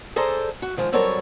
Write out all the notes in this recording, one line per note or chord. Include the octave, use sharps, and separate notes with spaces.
G#4 A4 C5 D5 A#5
F#4
D#3 F3 G#3
F#3 G3 C4 A4 A#4 C#5